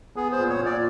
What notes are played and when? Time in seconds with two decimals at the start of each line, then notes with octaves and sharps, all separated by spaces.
0.16 B3 G#4
0.32 C5
0.38 A#2
0.49 C#5
0.60 A#2
0.66 D5